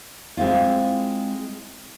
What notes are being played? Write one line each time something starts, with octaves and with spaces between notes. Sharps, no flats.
G#3 C4 E4 F4